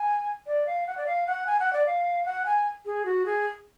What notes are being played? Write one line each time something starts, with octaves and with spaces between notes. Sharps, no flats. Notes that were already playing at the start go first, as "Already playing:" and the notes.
Already playing: G#5
D5
F5
F#5
D5
F5
F#5
G#5
F#5
D5
F5
F#5
G#5
G#4
F#4
G#4